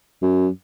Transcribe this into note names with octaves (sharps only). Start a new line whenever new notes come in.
F#2